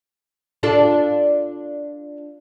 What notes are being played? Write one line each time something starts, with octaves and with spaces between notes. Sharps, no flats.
D4 F4 A4